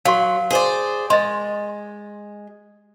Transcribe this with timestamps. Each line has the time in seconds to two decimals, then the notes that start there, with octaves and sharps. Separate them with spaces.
0.05 F#3 F5 C6
0.51 G#4 C5 D5
1.10 G#3 D#5 C6